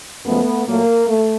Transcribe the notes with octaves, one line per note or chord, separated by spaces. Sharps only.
F#2 C#3 F3 G#3 A3 B3
A#2 F#3 A3 A#3
A3